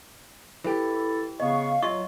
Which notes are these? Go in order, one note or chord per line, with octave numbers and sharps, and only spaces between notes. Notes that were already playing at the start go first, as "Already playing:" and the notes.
E3 E4 G4 A4
C#3 B3 D#5 F5 C#6
F#3 F4 D#5 E5 C#6